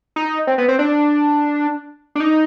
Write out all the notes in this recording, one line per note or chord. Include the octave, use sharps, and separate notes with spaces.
D#4
C4
B3
C4
D4
D4
D#4